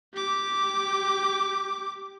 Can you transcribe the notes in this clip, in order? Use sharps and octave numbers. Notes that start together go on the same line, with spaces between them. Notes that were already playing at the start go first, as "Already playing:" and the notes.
G4 D6